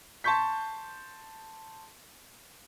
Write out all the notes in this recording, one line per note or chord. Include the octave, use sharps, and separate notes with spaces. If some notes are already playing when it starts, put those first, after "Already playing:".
A5 C6 C#6 G6 B6